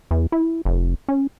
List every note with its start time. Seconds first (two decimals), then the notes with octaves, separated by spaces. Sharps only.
0.11 E2
0.32 E4
0.65 F1
1.08 C#4